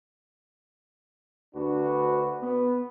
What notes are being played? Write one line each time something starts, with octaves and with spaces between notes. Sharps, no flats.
D2 D4 F#4 B4
B3